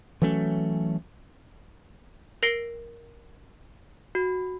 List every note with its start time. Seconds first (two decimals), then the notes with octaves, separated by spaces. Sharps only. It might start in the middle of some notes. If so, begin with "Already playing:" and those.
0.22 E3 F#3 A3 C#4
2.43 A#4 A#6 C7 D7 G7
4.15 F#4